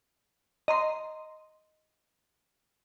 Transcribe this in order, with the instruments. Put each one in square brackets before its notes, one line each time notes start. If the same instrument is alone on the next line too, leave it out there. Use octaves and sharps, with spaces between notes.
[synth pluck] D#5 A#5 C6